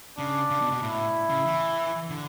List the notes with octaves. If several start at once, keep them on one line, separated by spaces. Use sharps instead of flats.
C#3 D4
C#3
B2
B2
A2 E4
C#3
E3
D3